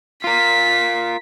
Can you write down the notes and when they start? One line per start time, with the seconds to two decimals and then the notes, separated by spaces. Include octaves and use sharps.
0.24 F4 A#4 B6